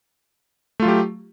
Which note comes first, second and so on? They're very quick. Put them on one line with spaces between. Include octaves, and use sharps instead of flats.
A3 F4 F#3 G4